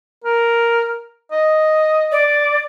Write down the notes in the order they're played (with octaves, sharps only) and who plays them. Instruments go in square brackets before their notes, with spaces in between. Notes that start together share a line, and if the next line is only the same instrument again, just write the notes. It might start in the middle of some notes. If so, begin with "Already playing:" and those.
[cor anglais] A#4
D#5
[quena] D5